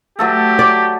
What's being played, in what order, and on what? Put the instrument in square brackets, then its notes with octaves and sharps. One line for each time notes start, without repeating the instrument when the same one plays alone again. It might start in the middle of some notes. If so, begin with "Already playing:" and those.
[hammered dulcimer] F#3 A3 A4 [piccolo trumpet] G4
[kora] D5